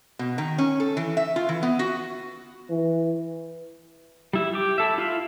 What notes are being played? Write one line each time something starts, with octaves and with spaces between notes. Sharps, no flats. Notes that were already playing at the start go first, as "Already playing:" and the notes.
B2
D#3
C#4
A4
E3
E5
F4
E3
B3
F#4
E3
G3 E4
G4 D6
E4 A4 E5
E4 F4 E5 F5